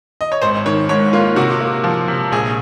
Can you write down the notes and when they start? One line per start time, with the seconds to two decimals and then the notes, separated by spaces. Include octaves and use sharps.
0.21 D#5
0.32 C#5
0.42 G#1 C5
0.66 D#3 C#5
0.89 G#2 C#5
1.13 A#3 F4
1.36 C3 F#4
1.61 A#3
1.84 F3
2.08 C3
2.32 A#1 G#4